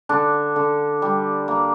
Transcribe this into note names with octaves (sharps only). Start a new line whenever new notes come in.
D3 D4
D3
G3
A#3